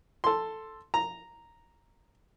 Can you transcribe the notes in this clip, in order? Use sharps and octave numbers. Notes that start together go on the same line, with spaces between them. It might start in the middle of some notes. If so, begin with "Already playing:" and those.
A4 C6
A#5